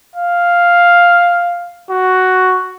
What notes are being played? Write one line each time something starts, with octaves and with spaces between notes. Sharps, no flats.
F5
F#4